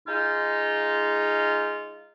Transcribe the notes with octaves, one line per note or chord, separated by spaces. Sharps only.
G#3 D#4 F4